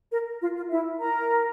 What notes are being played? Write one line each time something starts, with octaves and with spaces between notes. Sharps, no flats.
A#4
F4
F4
E4 E5
A#4 A#5